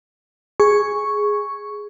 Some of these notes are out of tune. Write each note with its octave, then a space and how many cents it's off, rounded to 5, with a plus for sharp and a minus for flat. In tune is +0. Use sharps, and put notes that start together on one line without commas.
G#4 +0 C#6 +0